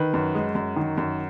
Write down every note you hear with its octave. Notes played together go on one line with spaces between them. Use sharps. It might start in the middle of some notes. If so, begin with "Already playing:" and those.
Already playing: D#3 B4
F#2
G#3
F#2
D#3
F#2